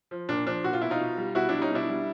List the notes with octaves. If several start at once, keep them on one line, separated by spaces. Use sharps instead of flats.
F3
A#2 D4
F3 D4
A#2 F#4
F4
B2 E4
D#4 F4
B2
G3
B2 E4 F#4
G3 D4 E4
C#4 D#4
B2 D4 E4
G3